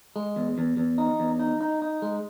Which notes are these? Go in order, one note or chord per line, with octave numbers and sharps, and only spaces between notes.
G#3
E2
E2
E2
D#4
E2
D#4
D#4
D#4
G#3